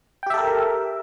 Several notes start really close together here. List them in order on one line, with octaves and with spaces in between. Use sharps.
G5 G4 E5 A4 A#4